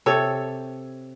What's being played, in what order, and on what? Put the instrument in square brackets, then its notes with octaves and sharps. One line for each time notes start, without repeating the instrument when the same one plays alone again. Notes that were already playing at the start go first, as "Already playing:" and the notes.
[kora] C3 A4 C#5